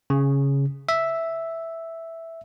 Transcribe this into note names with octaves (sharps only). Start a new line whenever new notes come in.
C#3
E5